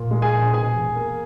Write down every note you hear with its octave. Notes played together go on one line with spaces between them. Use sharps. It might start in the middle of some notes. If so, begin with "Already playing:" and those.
Already playing: A#2
G#3
G#4 G#5
A#1
B2 G#4 G#5
E1
A#3